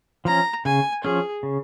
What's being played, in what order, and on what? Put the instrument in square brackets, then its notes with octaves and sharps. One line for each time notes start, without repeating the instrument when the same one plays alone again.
[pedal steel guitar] F3 C#4 [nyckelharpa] A#5
[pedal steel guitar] C#3 [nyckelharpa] G#5
[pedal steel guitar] F3 C#4 [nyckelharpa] G#4
[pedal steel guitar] C#3